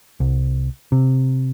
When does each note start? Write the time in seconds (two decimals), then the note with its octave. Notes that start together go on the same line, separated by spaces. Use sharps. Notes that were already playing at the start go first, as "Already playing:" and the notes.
0.20 C2
0.92 C3